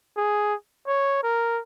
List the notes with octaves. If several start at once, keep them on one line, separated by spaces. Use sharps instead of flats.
G#4
C#5
A#4